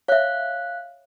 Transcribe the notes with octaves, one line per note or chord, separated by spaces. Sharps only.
C#5 E5 F5 F#6